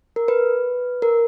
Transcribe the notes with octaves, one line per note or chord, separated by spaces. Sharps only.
A#4
B4
A#4